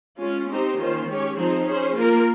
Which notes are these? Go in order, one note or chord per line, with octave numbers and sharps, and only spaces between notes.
G#3 C#4 F4
C4 D#4 G4 C5
D#3 A#3 C#4 F4 C5
G#3 C#4 G4 C#5
F3 C4 D#4 G#4 C5
C#4 G#4 C5
A#3 F4 A#4